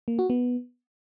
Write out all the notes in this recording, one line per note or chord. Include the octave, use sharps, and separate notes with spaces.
A#3
F#4
B3